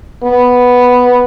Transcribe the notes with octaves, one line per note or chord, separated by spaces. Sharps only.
B3